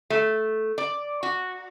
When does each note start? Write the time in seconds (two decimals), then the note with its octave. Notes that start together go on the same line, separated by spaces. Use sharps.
0.10 A3
0.78 D5
1.23 F#4